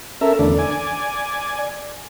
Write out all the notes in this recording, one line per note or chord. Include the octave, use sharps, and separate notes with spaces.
C#4 A4 A#4 E5
E2 D3 A3 D4
D5 G#5